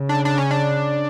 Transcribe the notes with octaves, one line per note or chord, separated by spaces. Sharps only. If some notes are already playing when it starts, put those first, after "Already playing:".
Already playing: C#3
D4
D4
C#4
D4